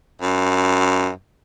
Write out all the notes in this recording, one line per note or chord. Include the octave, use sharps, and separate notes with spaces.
F#2